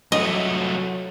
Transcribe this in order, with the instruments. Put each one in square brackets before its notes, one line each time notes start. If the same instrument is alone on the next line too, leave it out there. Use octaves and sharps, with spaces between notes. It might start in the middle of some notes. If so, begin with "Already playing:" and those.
[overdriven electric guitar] C2 A3 [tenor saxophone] F#3 [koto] D#5